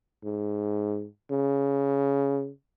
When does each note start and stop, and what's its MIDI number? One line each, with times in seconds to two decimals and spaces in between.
0.24 1.06 44
1.31 2.49 49